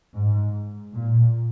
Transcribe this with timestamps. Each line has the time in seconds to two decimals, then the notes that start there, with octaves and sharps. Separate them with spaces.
0.13 G#2
0.94 A#2